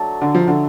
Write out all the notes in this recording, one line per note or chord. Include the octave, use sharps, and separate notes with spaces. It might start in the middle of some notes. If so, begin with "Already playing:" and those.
Already playing: F#3 A3 D4
D3
F3
D3